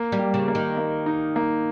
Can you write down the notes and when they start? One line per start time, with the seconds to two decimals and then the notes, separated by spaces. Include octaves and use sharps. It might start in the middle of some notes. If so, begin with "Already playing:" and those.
Already playing: A#3
0.12 G3
0.19 G4
0.34 C#3
0.48 A#3
0.55 D#3
0.77 A#3
1.06 D#4
1.36 A#3